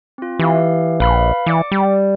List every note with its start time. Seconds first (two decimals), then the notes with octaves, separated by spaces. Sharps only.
0.18 C4 F4
0.39 E3 G4 F5
1.00 A#1 B4 F5 B5
1.46 E3 D5 D6 C#7
1.71 G3